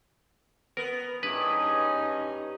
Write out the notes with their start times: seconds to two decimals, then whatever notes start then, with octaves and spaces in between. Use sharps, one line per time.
0.77 B3 A#4
1.23 G2 C#4 D#4 E4 G#4 B4